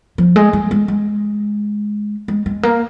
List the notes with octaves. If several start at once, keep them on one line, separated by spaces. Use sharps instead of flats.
F3
G#3
G#3
G#3
G#3
G#3
G#3
A#3